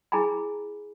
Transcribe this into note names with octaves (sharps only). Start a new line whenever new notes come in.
E4 G#4 G#5 A#5 B5